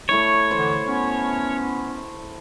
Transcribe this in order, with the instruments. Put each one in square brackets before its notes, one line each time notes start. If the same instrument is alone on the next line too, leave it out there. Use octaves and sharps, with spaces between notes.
[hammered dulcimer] A3 E4 D5 [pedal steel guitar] C#5
[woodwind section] D3 E3 [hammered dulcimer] C5
[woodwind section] B3 C#4